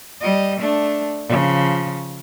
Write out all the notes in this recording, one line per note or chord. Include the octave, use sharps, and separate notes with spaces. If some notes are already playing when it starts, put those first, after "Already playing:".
G3 D#5
A3 D4
C#3 F3